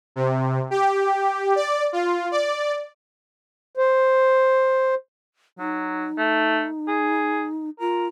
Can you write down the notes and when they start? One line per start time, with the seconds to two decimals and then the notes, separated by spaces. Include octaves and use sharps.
0.16 C3
0.71 G4
1.56 D5
1.93 F4
2.32 D5
3.77 C5
5.59 F#3 D#4
6.18 A3
6.88 G#4
7.80 F4 A#4